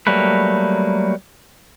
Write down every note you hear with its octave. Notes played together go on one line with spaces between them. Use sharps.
F#3 G3 A3 A#3 B4